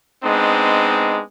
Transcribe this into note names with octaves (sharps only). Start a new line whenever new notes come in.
G#3 B3 C4 D4 D#4